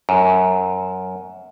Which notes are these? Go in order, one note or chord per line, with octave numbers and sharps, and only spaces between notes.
F#2